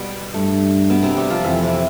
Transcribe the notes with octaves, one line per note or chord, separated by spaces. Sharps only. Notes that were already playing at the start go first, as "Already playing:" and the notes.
Already playing: B2 G3
G2 A3
B2 B3
C3 C4
G3 G4
F3 F4
F2 E3 E4
C3 C4